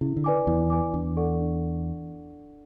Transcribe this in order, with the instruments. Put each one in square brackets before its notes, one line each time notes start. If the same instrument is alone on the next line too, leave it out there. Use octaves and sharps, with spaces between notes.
[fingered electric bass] C#3 [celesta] E4
[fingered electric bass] D3
[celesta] B4 D5 G#5 D6
[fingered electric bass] E2 [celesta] E4
[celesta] B4 D5 G#5 D6
[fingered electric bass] E2 [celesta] D4
[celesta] A4 D5 F#5 C#6
D4